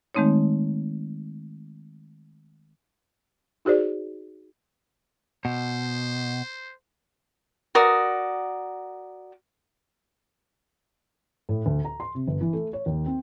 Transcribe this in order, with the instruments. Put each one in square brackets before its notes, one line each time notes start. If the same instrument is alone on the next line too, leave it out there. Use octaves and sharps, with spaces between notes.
[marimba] D#3 G#3 A3 C4 D#4 C#5
[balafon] D#4 F#4 G#4 C5 D5
[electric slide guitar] B2 [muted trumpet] C5
[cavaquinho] F#4 A#4 D5 D#6
[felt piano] A2
D2
A#5
C6
C3
G1
E3
A3
C#5
D#2
C4